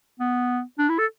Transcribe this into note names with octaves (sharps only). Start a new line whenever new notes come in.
B3
D4
E4
A4